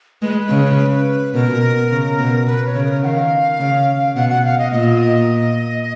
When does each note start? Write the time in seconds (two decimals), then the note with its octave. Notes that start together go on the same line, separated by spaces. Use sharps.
0.22 G#3 B4
0.49 C#3
1.34 B2 A#4
1.91 C#3
2.19 B2
2.46 B2 B4
2.66 C#5
2.75 C#3
2.84 A#4
3.03 D#3 F5 F#5
3.60 C#3
4.15 B2 F#5
4.30 F#5
4.44 F5
4.58 D#5
4.72 A#2 D#5